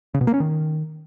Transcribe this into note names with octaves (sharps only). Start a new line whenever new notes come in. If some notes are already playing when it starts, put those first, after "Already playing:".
C#3
B2
A#3
C#4
D#3